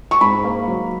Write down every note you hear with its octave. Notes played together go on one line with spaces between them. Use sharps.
C#6
G#2 B5
A#3
F#3